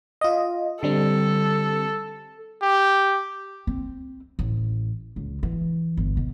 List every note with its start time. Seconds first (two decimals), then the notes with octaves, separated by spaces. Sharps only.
0.21 F4 D#5
0.83 D3 G3 C4 A4
2.62 G4
3.67 C4
4.39 A1
5.16 C#2
5.43 E3
5.97 G1
6.17 B2